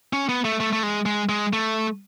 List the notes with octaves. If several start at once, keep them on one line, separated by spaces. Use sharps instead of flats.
C#4
B3
A3
A3
A3
G#3
G#3
G#3
A3